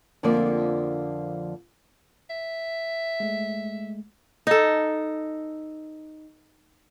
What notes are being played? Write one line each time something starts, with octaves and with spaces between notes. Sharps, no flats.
F2 D3 F3 A#3 D5
E5
G#3 A3
D#4 A4